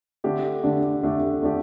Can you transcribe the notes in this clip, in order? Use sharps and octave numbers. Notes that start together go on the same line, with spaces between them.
D3 A3 D4 G4
D3 A3 D4 G4
D3 A3 D4 G4
D3 A3 D4 G4